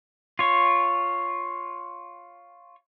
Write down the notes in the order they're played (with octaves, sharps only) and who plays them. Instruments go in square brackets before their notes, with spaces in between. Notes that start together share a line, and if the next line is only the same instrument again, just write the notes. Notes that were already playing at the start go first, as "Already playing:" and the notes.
[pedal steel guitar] F4 C#5